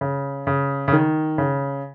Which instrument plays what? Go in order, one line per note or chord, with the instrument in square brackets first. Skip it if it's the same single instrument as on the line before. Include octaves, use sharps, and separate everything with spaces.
[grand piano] C#3
C#3
C#3
D#3
C#3